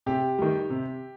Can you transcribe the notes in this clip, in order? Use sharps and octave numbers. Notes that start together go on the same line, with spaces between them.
C3 G4
D#3 G3
C3